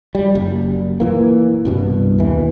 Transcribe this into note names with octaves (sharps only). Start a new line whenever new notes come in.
G3
F#1
A#2 E3 A#3
C2 G2 B2
D#2 E3